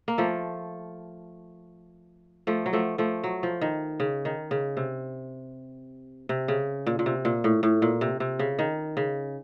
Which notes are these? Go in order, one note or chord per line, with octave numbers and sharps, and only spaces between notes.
A#3
F3 A3
F3 A3
F#3
F3 A3
F3 A3
F#3
F3
D#3
C#3
D#3
C#3
C3
C3
C#3
A#2
A#2
C3
A#2
A2
A2
A#2
C3
C3
C#3
D#3
C#3